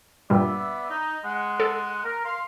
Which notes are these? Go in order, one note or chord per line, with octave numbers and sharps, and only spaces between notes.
G2 A#2 G3 B3 D5 E5
D#4
G#3 F#5
A4
A#4
F5 C6